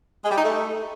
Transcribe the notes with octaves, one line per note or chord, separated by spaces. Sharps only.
G#3
G3
D#4
A3